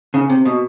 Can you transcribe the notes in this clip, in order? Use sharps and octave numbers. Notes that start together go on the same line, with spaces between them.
C#3
C3
B2